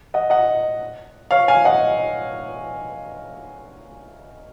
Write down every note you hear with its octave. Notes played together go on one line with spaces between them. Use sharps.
D#5 F#5
D#5 F#5
C#5 F5
F5 G#5
D#5 F#5